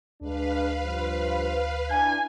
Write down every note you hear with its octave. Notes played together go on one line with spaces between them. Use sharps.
D2 G#3 D4 B4 F5
G2 F3 C5
D4 E4 G#5